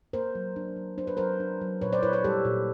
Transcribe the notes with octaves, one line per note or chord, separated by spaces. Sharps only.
A#3 A#4 C5
F#3
D4
F#3
D4 C5
B4
F#3 A#4 C5
D4
F#3
A#2 B4 C#5
C5 D5
E4 B4 C#5
B4 C#5
G3 G4 A4
A#2